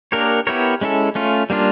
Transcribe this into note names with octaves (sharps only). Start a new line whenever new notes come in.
A#3 D4 G4 A#4 C#5
B3 E4 G4 A#4 C#5
G#3 C#4 E4 A4
A3 C#4 F4
G3 A#3 D4 F4